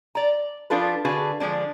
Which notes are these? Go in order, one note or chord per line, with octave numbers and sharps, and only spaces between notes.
D5 A#5
F3 D4 F4 A4 B4
D3 F#4 G#4 B4 F5 A5
D3 F3 G#3 A#3 D4